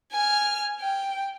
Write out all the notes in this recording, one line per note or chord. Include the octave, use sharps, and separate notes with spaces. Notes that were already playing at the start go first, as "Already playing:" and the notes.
G#5 F6
G5